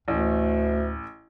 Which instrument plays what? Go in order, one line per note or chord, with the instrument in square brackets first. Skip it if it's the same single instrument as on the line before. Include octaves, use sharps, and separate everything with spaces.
[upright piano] A1 [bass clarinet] D2